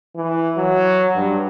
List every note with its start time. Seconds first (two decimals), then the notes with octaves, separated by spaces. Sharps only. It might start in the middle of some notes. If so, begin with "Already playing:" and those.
0.16 E3
0.57 F#3
1.16 G2